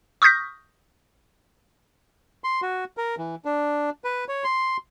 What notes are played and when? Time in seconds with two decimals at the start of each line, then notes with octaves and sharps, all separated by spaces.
0.22 C#6 D#6 F6 G6 A#6 B6
2.44 C6
2.62 F#4
2.97 A#4
3.18 E3
3.45 D4
4.04 B4
4.28 C#5
4.44 C6